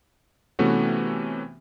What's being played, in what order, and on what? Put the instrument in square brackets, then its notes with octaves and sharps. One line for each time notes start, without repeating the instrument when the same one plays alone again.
[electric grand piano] C3 E3 A3 B3 C#4 F#4